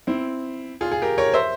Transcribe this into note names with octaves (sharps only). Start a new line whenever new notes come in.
C4 E4
F4 G#4
F4 G#4
G4 A#4
A#4 C#5
C5 E5